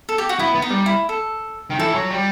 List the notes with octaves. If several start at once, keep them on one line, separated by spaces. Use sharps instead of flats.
A4
G4
F#4
B3 E4
B3
D#4
G3
E4
A4
D#3
E3 A4
F#3
G3